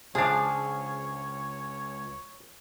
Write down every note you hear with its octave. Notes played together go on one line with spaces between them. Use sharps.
C#2 F3 D4 G#4 C#5 F5